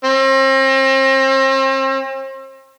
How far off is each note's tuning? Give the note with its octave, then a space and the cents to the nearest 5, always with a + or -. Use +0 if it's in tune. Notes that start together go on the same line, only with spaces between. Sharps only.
C4 +40